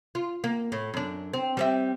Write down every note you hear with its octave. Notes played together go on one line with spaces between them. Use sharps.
F4
A#3
A2
F#2 D4
C4
G3 C4 E5